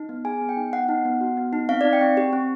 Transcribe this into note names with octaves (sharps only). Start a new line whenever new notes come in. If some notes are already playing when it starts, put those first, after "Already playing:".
Already playing: D#4
B3
G#4 G#5
B3
G5
D#4
B3 F#5
D#4
B3
F#4
B3
D#4
C4 F5
D5
D#4
G5
C4
G4
C4